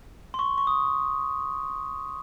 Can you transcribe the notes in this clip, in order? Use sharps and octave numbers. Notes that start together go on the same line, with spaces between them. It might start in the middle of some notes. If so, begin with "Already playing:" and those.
C6
C#6
C#6
D#6